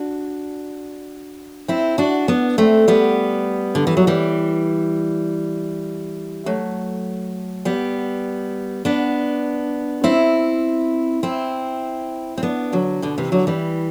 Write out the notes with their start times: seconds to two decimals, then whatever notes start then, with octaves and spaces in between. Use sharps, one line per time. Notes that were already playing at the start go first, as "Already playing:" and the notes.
Already playing: D4 F#4
1.68 C4 E4
1.98 D4 F#4
2.28 B3 D4
2.58 A3 C4
2.88 G3 B3
3.75 D3
3.87 E3
3.97 F#3
4.07 E3 G3
6.46 F#3 A3
7.65 G3 B3
8.85 B3 D4
10.04 C4 E4
11.23 C4 E4
12.38 C4
12.43 B3 D4
12.73 D3 F#3
13.02 B2 D3
13.18 C3 E3
13.32 D3 F#3
13.47 E3 G3